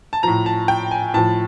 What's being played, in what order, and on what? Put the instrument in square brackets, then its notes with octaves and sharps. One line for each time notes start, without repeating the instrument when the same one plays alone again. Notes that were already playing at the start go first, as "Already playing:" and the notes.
[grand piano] A5
A2 F3 A#5
A5
G5
G#5
A2 F3 A5